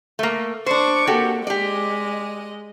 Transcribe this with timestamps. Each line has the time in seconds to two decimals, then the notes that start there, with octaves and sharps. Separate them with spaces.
0.19 A3 A#3
0.66 D4 C5 D5 C#6 D6
1.07 C3 A#3 F#4 G4 A4
1.47 G#3 G4 D5 D#5